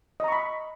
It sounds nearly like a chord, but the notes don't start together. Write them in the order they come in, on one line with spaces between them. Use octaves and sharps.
D#5 A#5 C#6 B5